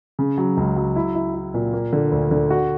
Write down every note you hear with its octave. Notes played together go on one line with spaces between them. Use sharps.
C#3
F#3
C#2
F#3
E4
E4
E4
A#2
A#3
D3
D2
D3
F#4